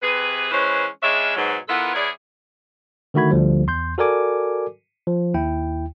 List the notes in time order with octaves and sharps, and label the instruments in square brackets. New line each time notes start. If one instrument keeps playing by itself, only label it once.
[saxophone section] C3 G#4 B4
E3 G#3 C#4 B4 C5
C#3 G#3 C#4 D4 D#5 E5
G#2 B2 F#3
E3 B3 F4 A4 A#4 F#5
E2 E4 G#4 C#5 D5
[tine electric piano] D3 D#3 A3 F#4 B5 G#6
D2 D3 F3 G3
E2 C6 G6
F#4 A4 A#4 D5 G#5 D6
F3
D#2 E4 G5